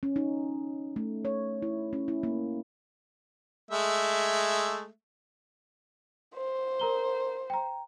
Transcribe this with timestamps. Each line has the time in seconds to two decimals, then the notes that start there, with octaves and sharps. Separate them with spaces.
0.03 C#4
0.16 D#4
0.96 A3
1.25 C#5
1.62 E4
1.93 C#4
2.08 E4
2.23 A#3
3.71 G#3 A3 E5
6.35 C5
6.80 A#4 A#5 G7
7.50 G5 A#5